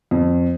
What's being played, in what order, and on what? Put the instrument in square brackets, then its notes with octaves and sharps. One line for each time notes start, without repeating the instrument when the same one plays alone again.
[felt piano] F2